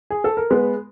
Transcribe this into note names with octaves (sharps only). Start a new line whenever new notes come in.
G#4
A4
A#4
G#3 B3 B4